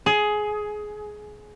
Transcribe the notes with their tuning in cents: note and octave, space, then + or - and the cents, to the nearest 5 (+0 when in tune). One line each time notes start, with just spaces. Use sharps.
G#4 +15